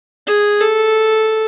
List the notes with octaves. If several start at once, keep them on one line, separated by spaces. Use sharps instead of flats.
G#4
A4